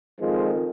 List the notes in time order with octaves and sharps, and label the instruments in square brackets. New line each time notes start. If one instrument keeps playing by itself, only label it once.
[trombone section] F2 D#3 F3 G#3